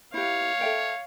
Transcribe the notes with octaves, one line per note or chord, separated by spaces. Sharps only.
E4 G4 C#5 F5
A4 E5 G5